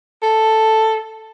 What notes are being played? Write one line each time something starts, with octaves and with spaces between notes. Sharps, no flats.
A4